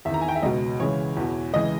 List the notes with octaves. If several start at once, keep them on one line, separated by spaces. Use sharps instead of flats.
E2 D#3 E5
A#5
G#5
G5
E5
C#2 B2 D#5
C#2 C#3 E3 C#5
E2 B2
C#2 C#3 E3 D#5